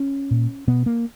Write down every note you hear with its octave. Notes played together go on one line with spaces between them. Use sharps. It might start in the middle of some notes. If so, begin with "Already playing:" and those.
Already playing: C#4
A#2
B2 B3
A#3